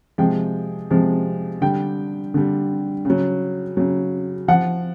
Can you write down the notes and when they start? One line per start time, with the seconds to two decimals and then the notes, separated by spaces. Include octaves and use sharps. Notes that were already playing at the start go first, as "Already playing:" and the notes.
0.18 C3 F3 G#3 G5
0.91 C3 F3 G#3
1.61 D3 G3 G5
2.34 D3 G3
3.05 C#3 F#3
3.77 C#3 F#3
4.48 F3 F#5